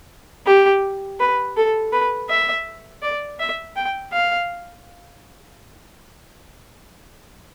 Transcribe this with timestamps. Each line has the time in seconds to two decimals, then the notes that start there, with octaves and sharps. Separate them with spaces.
0.46 G4
1.20 B4
1.57 A4
1.93 B4
2.30 E5
3.02 D5
3.40 E5
3.76 G5
4.13 F5